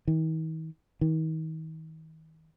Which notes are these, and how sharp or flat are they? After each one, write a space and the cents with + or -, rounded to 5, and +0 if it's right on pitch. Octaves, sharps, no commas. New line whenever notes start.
D#3 +45
D#3 +40